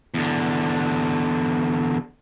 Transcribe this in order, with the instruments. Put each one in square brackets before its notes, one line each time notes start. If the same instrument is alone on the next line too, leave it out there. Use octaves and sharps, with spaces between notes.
[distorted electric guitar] E2 D3